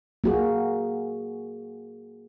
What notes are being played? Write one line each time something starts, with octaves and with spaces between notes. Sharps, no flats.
A#3 F#4 G#4